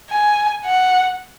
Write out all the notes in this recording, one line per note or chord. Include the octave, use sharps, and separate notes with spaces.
G#5
F#5